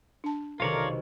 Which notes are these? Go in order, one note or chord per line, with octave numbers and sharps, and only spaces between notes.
D4 A5
B1 C3 D#3 F4 A4 A#4 C#5 D5